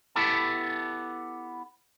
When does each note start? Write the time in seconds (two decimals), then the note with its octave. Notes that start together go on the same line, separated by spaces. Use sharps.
0.16 B3 E4 G4 A4 A5